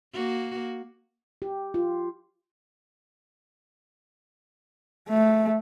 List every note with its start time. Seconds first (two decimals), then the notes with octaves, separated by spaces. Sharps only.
0.13 A#3 F#4
1.42 G4
1.74 F4
5.09 A3